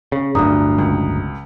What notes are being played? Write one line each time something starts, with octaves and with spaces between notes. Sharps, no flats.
C#3
D1 G1 D2 G2 A#5 D#6
C#2